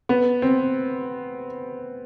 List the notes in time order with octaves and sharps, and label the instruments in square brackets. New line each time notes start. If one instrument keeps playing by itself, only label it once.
[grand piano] B3
C4